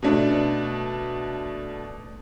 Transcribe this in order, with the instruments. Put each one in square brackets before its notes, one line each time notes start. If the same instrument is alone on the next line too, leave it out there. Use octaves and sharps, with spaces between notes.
[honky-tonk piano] B2 A3 D4